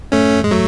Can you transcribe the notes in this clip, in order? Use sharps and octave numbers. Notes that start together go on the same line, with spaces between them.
F#2 A2 A3 C#4
E2 G#2
G#3
F#3 A3